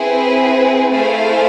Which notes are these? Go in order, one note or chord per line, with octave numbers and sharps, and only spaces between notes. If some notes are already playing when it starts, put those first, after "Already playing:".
Already playing: C4 E4 G#4 B4
A3 E4 G#4 C5 F5